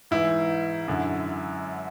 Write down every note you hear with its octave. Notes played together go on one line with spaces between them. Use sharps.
G#2 E3 E4
F#2 D3